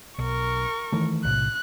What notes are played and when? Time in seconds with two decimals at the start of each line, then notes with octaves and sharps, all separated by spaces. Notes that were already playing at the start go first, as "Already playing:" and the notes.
0.19 B1 A#4 C#6
0.92 D#3 E3 A3
1.24 B1 A2 C3 F#6